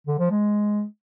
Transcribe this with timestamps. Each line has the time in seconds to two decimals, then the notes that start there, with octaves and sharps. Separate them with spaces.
0.07 D3
0.19 F3
0.31 G#3